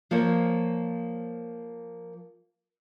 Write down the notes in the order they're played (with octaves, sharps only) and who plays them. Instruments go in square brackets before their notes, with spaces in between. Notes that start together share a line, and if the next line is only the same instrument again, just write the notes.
[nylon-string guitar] F3 A#3 C5 C#5